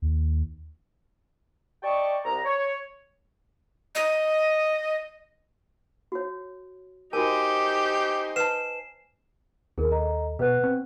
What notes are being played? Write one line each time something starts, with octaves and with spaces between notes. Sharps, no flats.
D#2
D5 D#5 G5 A5 C#6
C2 A#5
C#5
D#5
F#4 C#5
D#4 F#4 G4 A#4 C5 G#5
B4 A5 C7 E7
D#2 G#4 A#4
A4 D#5 A#5
B2 B4 F#5 F#6
C4